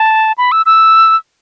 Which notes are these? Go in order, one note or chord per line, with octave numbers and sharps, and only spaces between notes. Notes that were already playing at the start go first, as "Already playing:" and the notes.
Already playing: A5
B5
E6
E6